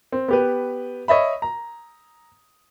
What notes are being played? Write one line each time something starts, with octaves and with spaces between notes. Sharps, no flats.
C4
B3 G4 B4
C#5 D#5 E5 B5
A#5